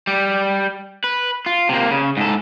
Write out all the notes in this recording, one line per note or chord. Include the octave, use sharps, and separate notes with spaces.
G3
B4
F4
C3 A#3
C#3
G#2 A4